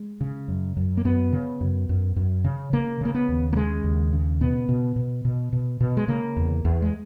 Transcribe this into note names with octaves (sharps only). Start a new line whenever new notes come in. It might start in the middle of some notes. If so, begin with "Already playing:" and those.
Already playing: G#3
C#3
F#2
F#2
A#3
F#2 B3
C#3
F#2
F#2
F#2
C#3
C#3 A#3
C#3 A#3
B3
D#2
A#3
C#3 G#3
D#2
C#3
B2 B3
B2
B2
B2
B2
B2
G#3
C#3 A#3
E2
E2
G#3